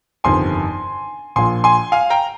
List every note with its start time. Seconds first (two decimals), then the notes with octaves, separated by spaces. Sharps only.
0.24 G1 F2 C3 D#3 G#5 C6
1.36 A#1 A#2 F3 G#5 C6
1.64 G#5 C6
1.92 F5 G#5
2.10 G5 A#5